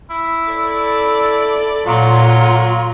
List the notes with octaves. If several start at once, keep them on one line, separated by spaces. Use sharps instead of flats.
E4
A4 D5
A#2 F#3 F4 A#5 C6